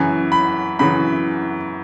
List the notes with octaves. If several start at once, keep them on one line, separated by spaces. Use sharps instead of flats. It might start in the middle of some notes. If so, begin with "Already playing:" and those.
Already playing: F#2 C#3 E3 G#5
B5
F#2 C#3 E3 B5